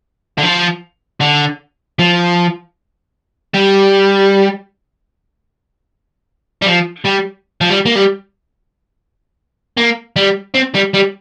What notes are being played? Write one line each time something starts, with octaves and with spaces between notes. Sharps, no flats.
D3
F3
D3
F3
G3
G3
F3
G3
F3
G3
A#3
G3
A#3
G3
C4
G3
G3